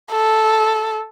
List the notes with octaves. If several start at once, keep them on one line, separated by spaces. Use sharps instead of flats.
A4